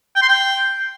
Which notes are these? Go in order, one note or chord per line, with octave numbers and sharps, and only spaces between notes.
G5
C6
G5